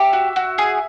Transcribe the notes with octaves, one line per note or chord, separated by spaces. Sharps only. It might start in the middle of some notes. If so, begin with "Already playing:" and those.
Already playing: G4 E5
F#4
F#4
G#4